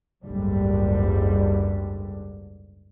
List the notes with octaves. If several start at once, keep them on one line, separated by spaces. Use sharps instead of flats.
F#1 C#2 G#2 D3 G3